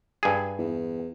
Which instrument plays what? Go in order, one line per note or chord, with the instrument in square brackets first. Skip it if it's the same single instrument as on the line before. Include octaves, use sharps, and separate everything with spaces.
[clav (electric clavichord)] G2 G#4
[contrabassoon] E2